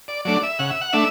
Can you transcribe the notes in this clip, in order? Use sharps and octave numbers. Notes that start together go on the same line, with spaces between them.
D5
F#3 A3 D4 D5
E5
C#3 F#5
E5
F#5
A3 D4 E5